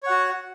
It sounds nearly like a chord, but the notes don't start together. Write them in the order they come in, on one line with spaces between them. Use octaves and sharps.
C#5 F#5 F#4